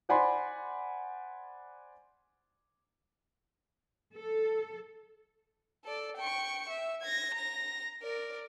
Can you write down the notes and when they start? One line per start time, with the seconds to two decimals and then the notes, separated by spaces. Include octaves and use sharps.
0.09 C5 D5 F#5 G#5 B5 C6
4.17 A4
5.84 A4 D5
6.17 G5 C#6
6.70 E5
7.02 G#6 A#6
7.35 A#5 A#6
8.02 A#4 D5